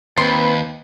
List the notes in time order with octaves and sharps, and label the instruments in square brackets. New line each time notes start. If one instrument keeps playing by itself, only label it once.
[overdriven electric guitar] D#2 [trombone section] C4 B4 [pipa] C6